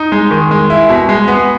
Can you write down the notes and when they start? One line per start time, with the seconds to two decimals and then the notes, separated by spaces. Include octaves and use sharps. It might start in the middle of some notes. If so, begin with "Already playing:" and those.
Already playing: D#4
0.12 G#3
0.31 D#3
0.51 G#3
0.70 E4
0.89 B2
1.09 G#3
1.28 B3